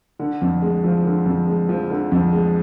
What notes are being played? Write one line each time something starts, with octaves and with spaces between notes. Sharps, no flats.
D3
F2
G#3
F3
D3
F2
G#3
F3
D3
F2
G#3